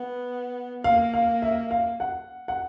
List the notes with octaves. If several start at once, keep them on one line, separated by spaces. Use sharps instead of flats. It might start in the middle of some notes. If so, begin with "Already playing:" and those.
Already playing: B3
A#3 F5
F5
E5
F5
F#5
F#5